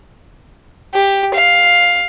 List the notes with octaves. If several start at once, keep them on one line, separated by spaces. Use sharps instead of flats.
G4
F5